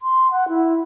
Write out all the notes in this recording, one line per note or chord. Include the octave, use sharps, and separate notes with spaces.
C6
F#5
E4